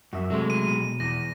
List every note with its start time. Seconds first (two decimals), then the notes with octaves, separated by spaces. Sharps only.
0.13 F#2 F#4 E5
0.30 C3 F#3 G#3 A3
0.50 D#7
0.67 B2
1.00 E2 A#6